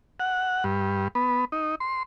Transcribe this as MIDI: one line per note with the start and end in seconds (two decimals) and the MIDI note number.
0.20 0.64 78
0.64 1.08 43
1.15 1.45 59
1.52 1.75 63
1.80 2.03 84